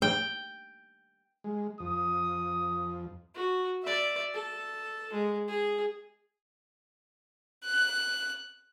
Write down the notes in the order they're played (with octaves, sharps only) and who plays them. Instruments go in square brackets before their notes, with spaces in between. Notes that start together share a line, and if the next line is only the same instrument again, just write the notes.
[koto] G5
[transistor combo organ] G#3
[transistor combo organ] F2 [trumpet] D#6
[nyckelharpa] F#4
D5 E5
A4
G#3
G#4
[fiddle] F#6